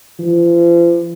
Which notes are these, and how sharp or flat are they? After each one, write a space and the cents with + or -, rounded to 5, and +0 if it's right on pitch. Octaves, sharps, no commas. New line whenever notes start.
F3 -40